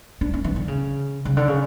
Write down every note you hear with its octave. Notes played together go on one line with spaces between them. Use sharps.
D4
C#4
E3
D3
C#3
C#3
D3
C#3